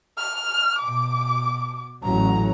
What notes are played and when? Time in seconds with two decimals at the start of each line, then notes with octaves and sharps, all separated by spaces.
0.18 F6
0.79 B2 D6
2.04 A1 F#3 C#4 A#5